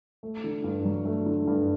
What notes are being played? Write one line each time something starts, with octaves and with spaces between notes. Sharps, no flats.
A3
D3
G2
F#3
A3
D3
G2